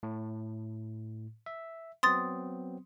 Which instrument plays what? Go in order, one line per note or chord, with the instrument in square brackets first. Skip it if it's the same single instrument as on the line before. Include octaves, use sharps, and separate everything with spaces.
[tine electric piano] A2
E5
[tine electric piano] F#3 B3 C4 [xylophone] C6 D#6 A6